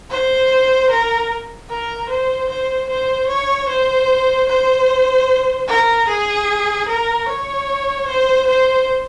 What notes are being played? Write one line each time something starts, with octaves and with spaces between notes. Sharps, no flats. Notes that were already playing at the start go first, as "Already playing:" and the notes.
C5
A#4
A#4
C5
C5
C5
C#5
C5
C5
A#4
G#4
A#4
C#5
C5
C5